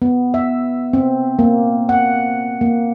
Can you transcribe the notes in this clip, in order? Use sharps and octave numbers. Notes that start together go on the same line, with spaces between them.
B3
E5
C4
A#3
F#5
A#3